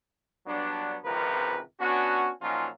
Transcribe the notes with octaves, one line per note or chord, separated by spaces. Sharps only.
G2 F#3 B3 D4
G#1 C#2 C3 F3 A#4 B4
B3 C#4 D4 F#4
A#2 F3 F#3 C#4 D#4 F4